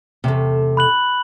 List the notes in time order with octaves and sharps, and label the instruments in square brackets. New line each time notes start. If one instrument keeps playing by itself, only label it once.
[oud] E2 A3 [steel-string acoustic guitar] C3
[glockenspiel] B5 F#6 F#7